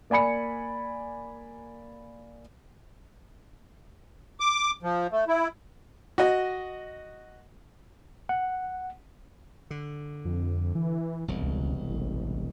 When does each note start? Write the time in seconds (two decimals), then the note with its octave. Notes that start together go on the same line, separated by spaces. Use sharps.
0.10 A#3 D5 G#5 B5 C#7
4.40 D6
4.83 F3
5.12 A3
5.28 E4
6.18 F#4 D#5
8.29 F#5
9.71 D3
10.25 F2
10.75 E3
11.28 E1 C2
11.43 C#2
11.90 A1